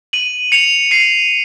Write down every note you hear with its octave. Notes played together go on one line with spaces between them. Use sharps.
D#7 F#7
C#7 F7
C7 D#7